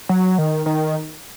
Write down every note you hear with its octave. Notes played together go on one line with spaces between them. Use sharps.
F#3
D#3
D#3